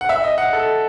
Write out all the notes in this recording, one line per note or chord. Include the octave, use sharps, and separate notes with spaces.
F#5
E5
D#5
F#5
A4